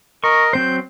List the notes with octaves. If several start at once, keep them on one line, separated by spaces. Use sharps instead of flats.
A#4 D#5 C#6
F#3 C4 C5 G6